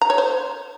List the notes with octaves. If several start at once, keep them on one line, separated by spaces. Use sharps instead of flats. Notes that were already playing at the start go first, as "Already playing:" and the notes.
A#5
C#5
C5